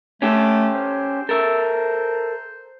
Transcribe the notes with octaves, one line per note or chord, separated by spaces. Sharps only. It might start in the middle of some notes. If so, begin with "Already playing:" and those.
A3 C#4 G4 A4
C5
A4 A#4 E5